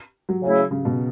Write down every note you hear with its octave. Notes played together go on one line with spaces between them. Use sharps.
F#3
C#3 A3 E4
C#3
B2